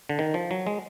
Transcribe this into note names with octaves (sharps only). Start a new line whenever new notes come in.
D3
D#3
F3
F#3
G#3